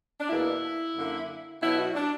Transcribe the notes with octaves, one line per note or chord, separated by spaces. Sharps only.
D4
E2 B2 A#3 E4
F#2 D3 A#3
B2 F#3 B3 E4
F#4
D4